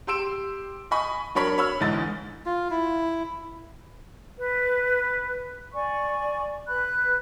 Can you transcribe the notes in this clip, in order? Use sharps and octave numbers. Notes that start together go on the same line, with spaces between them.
G4 C6 E6 D7 E7
D#5 G#5 B5 C#6
F#3 D4 A#4 C#5 B5 B6
C#5 B5 E6 F6
G1 G#2 E3 D#5 A6
F4
E4
B4
D5 G#5 C#6
B4 B5 F#6